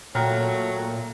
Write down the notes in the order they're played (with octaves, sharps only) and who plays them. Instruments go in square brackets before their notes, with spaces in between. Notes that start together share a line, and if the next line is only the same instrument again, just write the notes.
[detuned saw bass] A#2 [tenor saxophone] F#3 [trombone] A3 [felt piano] G5 A#5 F6